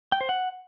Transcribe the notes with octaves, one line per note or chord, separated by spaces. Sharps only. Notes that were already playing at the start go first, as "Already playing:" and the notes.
G5
C5
F#5